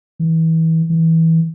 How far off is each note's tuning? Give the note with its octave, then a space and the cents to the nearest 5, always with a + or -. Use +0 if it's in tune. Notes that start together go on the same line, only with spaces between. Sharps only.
E3 -30
E3 -20